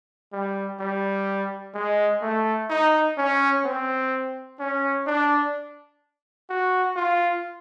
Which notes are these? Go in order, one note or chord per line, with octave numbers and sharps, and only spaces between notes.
G3
G3
G#3
A3
D#4
C#4
C4
C#4
D4
F#4
F4